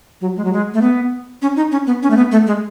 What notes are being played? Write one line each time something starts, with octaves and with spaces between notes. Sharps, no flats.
F#3
G#3
F#3
G#3
A3
B3
C#4
D#4
C#4
B3
C#4
A3
B3
A3
G#3